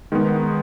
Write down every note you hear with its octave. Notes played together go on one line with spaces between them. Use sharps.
D#3 G#3 B3 D#4